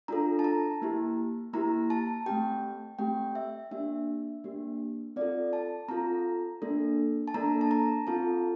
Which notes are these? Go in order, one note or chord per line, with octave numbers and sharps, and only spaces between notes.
D4 F4 A4 A#5
A5
A#5
A#3 E4 G4
A#3 E4 G4 A#5
A5
A3 C4 G4 G5
A3 C4 G4 G5
E5
A#3 D4 G4 E5
A#3 D4 G4
C4 F4 A4 D5
A5
C4 F4 A4 A#5
A#3 D4 A4
A5
A#3 D4 A4 A#5
A5
A#5
C4 F4 A4 A5